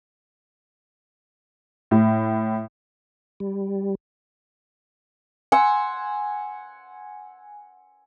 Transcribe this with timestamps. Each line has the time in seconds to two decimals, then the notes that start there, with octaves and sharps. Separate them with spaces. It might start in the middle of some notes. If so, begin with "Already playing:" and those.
1.91 A2
3.40 G3
5.52 F#5 G#5 C6 E6